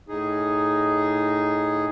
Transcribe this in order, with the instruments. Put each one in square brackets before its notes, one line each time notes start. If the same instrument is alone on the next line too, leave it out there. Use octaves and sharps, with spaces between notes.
[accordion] A2 D#4 G#4